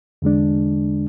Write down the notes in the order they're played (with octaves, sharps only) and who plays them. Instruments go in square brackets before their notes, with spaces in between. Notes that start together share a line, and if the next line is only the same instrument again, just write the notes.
[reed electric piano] E2 D3 G#3 D4